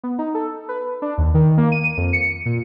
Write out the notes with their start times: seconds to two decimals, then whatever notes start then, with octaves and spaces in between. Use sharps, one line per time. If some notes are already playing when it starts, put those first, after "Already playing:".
0.04 B3
0.19 D#4
0.34 A4
0.69 B4
1.02 D4
1.18 D#2
1.34 D#3
1.58 A#3
1.72 D#7
1.97 F2
2.13 C#7
2.46 A#2